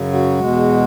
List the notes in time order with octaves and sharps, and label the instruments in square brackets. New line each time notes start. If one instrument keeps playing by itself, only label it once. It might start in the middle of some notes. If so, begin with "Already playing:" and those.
Already playing: [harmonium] F#2 C#3 F#3
F#4
E2 B2 G#3